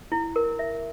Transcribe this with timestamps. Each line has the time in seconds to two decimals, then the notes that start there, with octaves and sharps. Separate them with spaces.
0.12 E4
0.36 A#4
0.59 E5